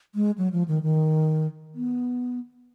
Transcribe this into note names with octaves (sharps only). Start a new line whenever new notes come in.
G#3
F#3
F3
D#3
D#3
B3